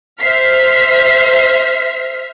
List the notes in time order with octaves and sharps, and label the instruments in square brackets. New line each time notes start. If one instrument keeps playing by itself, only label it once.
[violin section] C5 E5 F6 B6 C7